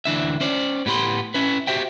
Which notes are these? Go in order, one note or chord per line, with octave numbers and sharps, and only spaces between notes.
D2 E3 D4 E5
C#4 C5 D5
A2 B3 G4 B5 C6
C#4 E4 B4
F#4 G4 C5 E5 G5